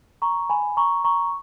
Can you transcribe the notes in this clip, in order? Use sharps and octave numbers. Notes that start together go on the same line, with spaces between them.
A#5 C#6
G#5 B5
A#5 C#6
A#5 C#6